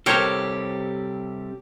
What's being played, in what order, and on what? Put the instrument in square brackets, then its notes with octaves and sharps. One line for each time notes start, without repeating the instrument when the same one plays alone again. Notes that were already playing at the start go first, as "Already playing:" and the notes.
[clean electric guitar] C3 G3 A4 [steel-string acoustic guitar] G4 [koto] A#4 C5 C#5